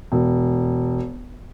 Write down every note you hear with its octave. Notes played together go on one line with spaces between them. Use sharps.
E1